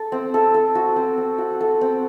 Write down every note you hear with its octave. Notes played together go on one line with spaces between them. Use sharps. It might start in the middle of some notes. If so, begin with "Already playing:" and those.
Already playing: A4
C4
A4
A4
F#4
C4
C4
F#4
A4
C4